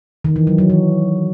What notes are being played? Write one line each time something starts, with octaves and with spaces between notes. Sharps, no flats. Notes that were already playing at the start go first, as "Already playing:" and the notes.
D#3
E3
F#3
F#3
E3